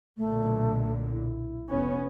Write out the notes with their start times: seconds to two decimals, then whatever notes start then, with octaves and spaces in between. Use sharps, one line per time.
0.17 B1 A#2 D3 A3
1.12 E4
1.69 F1 B3 C#4